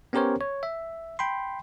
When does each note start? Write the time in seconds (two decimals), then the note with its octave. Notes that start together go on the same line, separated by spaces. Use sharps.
0.13 B3 C#4 G4 A#4 C5 C#5
0.41 C#5
0.63 E5
1.19 G5 B5 C6